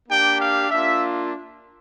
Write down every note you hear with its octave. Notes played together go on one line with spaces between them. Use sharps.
A#3 D4 G4 G5
F5
A#3 D4 F4 E5